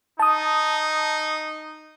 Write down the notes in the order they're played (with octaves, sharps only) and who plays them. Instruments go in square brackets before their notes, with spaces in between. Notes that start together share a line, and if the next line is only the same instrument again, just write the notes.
[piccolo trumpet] D#4 [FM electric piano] A5 D#6